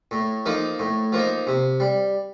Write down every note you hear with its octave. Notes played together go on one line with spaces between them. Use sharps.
A2
F3 A#3 D#4
A2
F3 A#3 D#4
C3
G3